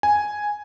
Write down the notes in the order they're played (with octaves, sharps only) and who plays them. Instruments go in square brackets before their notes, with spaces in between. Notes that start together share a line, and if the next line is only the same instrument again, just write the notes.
[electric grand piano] G#5